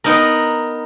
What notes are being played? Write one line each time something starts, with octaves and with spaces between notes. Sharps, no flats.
B3 D#4 A#4